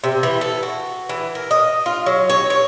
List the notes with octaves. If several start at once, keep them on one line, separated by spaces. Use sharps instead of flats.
C3
E3
A4
F#4
E3
A#4
D#5
F4
F#3
C#5
C#5